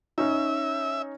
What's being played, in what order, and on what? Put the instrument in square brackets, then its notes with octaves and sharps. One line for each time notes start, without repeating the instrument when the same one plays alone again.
[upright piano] C#4 D#4 [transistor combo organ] E5